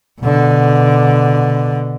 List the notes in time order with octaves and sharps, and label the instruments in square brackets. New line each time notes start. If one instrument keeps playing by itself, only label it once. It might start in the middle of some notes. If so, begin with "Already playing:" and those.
[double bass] B2 D3